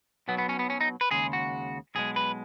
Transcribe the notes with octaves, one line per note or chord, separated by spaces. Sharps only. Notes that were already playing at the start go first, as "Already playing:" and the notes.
B1 B2 F#3 B3
B3
C#4
B3
C#4
D#4
B4
D#2 C#3 G#3 G#4
F#4
B1 B2 G#3 G#4
B4